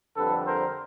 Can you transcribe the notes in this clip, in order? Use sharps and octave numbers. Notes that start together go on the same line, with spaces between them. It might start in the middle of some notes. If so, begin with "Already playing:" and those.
F2 D3 G3 A4 B4
A#4 C5